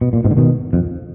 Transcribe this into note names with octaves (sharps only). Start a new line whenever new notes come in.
B2
A#2
G#2 B2
D3
B2 D#3
F2